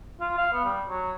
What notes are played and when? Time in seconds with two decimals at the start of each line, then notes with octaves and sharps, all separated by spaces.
0.21 F4
0.38 F5
0.53 B3
0.64 G3
0.89 F#3